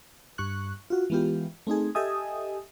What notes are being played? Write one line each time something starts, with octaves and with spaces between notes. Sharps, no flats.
G2 C#6 F#6
F4 F#4
E3 G#3 B3 F4 G4
A3 C4 D#4 G#4
G4 A4 D#5 E5 G#5 D#6